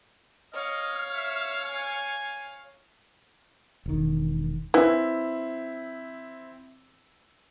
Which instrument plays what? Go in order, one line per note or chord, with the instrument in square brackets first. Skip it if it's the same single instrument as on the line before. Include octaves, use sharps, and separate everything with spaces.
[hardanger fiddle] C#5 F5 [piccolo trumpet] D#5 [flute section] F6
[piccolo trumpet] E5
G#5
[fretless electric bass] E1 D#3
[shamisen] E3 [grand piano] C4 E4